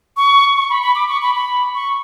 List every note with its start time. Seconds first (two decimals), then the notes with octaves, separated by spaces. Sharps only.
0.17 C#6
0.56 C#6
0.70 B5
0.82 B5
0.95 D6
1.09 C#6
1.22 B5
1.35 B5
1.74 C#6